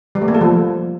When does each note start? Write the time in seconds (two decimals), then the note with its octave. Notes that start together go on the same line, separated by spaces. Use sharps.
0.15 G3
0.22 A3
0.28 A#3
0.34 A4
0.41 F3